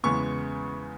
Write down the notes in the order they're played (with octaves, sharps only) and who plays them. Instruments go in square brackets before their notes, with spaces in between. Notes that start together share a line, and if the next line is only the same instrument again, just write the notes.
[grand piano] E2 C#3 G#3 B3 C#6